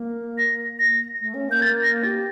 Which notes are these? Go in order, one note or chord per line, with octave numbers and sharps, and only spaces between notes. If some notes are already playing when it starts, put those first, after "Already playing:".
Already playing: A#3
A#6
A#6
A3
C#4
A#3 G6
A6
A#6
G4 A6